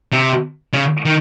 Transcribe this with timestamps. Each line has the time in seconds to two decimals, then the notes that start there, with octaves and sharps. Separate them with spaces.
0.12 C3
0.73 C#3
1.05 D#3